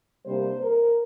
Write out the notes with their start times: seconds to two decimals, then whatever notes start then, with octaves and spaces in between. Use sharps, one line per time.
0.25 C3 G3 A#3 D4 C5
0.60 A#4